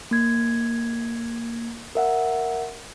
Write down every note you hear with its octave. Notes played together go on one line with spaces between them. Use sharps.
A#3 G#6
A#4 E5 F#5